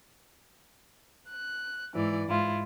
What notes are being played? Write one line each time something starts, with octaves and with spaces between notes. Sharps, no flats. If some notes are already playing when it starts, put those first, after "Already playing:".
F#6
G#2 E3 D5
G#2 E4 F4